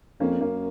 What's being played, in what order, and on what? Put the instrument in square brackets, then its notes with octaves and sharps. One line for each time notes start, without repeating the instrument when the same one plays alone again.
[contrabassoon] F2 [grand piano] A#3 C#4
[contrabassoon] F#2 [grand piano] A#3 C#4